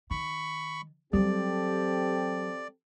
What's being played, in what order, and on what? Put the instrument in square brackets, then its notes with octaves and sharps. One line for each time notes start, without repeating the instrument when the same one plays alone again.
[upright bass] D#3 [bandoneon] B5 C#6
[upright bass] E3 F#3 [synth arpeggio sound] G3 [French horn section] C4 G4 A4 [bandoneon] D5